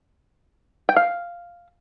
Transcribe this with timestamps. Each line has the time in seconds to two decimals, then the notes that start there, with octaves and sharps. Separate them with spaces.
0.89 G5
0.96 F5